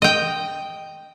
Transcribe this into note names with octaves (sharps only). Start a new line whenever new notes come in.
D#5 G5